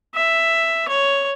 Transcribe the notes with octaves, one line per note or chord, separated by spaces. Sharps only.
E5
C#5